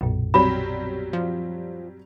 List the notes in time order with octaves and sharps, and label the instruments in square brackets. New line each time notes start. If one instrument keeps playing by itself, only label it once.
[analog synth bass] B1 [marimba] F#2 A#2
[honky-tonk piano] F#3 G3 C4 [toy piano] B5
[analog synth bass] F3